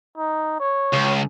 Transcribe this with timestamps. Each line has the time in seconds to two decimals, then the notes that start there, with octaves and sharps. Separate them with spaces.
0.17 D#4
0.60 C#5
0.93 C#2